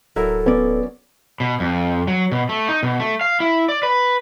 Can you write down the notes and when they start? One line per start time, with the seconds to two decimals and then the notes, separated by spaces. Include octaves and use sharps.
0.16 D1 F#3 E4 A4 A#4
0.46 B3 C#4 D5
1.40 B2
1.60 F2
2.07 F#3
2.32 B2
2.49 A3
2.69 D#4
2.83 B2
3.00 A3
3.21 F5
3.40 E4
3.69 D5
3.83 B4